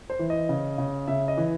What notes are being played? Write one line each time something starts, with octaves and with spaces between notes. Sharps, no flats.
C5
E3
D#5
C#3
C#3
C#3 E5
D#5
E3